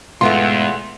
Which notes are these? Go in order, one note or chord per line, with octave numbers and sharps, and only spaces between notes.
E2 G#2 B2 A3 B3 F4 C6